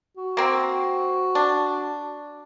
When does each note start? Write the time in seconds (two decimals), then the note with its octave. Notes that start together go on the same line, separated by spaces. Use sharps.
0.17 F#4
0.37 A#3 C4
1.35 D4